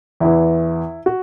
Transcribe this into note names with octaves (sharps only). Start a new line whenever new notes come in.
E2 E3 E4
F#4